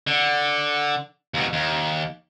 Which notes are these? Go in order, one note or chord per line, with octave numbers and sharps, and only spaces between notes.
D3
D#2 B2
D#2